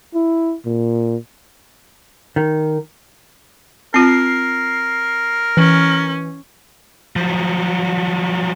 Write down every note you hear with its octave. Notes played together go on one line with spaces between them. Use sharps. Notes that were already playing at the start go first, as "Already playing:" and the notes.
E4
A#2
D#3
C4 F4 A#4 C7
E3 C#4
F3 F#3